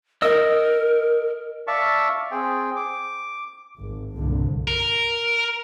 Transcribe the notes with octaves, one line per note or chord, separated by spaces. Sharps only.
A#4 D#5 E6
D5 E5 F5 A5 C#6
C4 G#4 G5
D6
G#1
C2 G2 A#2 D3
A#4